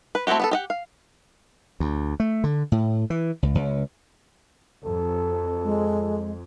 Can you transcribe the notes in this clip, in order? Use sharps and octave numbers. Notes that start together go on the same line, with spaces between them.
B4
A3 C4 E4 F#4 G4
B3 G4 A4
G4 D#5 F#5
F5
D2
A3
D3
A2
E3
C#2
C#2
F2 A4
G#3